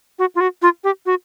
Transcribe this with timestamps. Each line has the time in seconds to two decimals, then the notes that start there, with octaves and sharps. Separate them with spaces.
0.19 F#4
0.35 F4
0.40 F#4
0.62 F4
0.84 G4
1.06 F#4